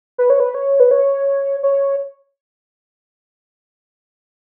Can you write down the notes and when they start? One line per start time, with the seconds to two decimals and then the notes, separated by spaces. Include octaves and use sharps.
0.18 B4
0.30 C#5
0.40 B4
0.55 C#5
0.80 B4
0.91 C#5
1.63 C#5